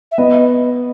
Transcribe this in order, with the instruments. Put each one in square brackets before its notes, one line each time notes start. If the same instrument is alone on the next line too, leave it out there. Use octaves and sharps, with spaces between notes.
[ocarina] E5
[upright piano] B3 [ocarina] D#5